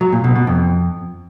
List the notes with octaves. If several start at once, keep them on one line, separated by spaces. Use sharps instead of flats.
F#3
A#2
B2
B2
F2